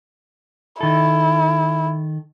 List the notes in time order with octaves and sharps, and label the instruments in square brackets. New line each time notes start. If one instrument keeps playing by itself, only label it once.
[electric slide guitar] D#3 A4 [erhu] E4